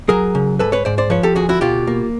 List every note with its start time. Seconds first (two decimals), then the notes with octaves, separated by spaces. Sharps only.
0.09 F#3 G#4 A#4
0.35 C#3
0.59 G#2 A4 B4
0.72 B4 C#5
0.85 G#2 C5 D5
0.98 C5 D5
1.10 F3 B4 C#5
1.23 G4 A4
1.36 D2 F#4 G#4
1.49 E4 F#4
1.61 B2 F4 G4
1.87 A#3